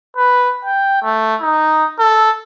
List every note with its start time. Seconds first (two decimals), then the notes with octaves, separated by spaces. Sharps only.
0.17 B4
0.65 G5
1.02 A3
1.41 D#4
1.99 A4